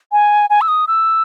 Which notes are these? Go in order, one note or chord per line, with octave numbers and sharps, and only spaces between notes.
G#5
G#5
E6
D#6
E6